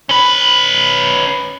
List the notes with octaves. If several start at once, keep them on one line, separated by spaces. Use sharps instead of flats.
C#4 B4